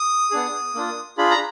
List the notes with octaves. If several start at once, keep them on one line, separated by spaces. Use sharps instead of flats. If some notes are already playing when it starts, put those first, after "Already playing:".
Already playing: D#6
B3 D4 G#4
A#3 D4 F4
D4 F4 G#4 B5
A#5